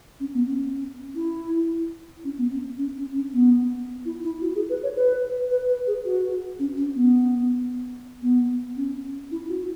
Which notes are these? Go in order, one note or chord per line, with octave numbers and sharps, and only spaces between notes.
C#4
B3
C#4
E4
C#4
B3
C#4
C#4
C#4
C#4
B3
E4
E4
F#4
G#4
B4
C#5
B4
B4
B4
G#4
F#4
C#4
C#4
B3
B3
C#4
E4
F#4